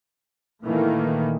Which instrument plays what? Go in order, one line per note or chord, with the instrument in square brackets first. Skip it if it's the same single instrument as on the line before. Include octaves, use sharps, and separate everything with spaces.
[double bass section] A#2 D#3 E3 A3 A#3